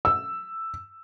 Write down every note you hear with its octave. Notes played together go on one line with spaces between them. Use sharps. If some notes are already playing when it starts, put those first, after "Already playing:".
E6